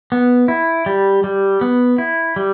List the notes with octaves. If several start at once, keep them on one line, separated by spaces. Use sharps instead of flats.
B3
E4
G3
G3
B3
E4
G3